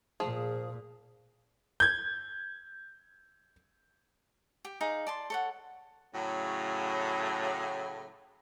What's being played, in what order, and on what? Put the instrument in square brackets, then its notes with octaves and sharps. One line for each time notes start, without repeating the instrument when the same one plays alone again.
[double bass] A#2 [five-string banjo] F3 [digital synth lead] G#4
[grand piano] G6 G#6
[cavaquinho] G4
D#4 G#4 F5
D5 A5 C6
A4 C#5 F#5
[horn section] A2 C#3 F#3